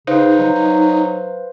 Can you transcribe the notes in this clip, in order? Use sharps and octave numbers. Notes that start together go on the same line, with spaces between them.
C#3 D#4 B4 C5 F5
F#3